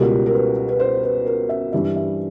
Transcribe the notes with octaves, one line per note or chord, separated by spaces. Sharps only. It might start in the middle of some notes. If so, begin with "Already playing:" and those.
Already playing: C#2 B2 G3 A#4
A#4
B4
B4
C5
B4
A#4
E5
G2 E3 G3 E5
E5